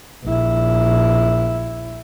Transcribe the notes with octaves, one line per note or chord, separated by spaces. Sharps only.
A#1 E4